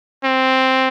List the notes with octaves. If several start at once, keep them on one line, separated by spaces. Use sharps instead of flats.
C4